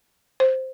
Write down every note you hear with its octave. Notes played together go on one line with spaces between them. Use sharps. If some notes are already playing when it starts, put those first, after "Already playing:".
C5